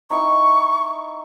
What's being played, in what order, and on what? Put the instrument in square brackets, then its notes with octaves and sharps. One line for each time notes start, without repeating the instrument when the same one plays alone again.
[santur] D#4 E4 G5 [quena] C#6